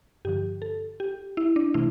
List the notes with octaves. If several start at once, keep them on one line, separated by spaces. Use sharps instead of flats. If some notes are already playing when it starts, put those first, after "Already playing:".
G2 D3 F3 G4
A4
G4
E4
D4
C3 E3 A3 E4